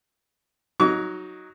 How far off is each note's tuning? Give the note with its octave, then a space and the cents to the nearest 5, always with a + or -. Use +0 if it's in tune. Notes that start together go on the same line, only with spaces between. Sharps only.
F#3 +0 D#4 +5 C#6 +45